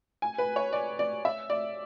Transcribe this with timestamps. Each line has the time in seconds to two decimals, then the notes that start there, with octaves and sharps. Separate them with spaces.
0.22 G#5
0.38 B4
0.56 C#5
0.73 D5
0.99 D5
1.25 E5
1.50 D5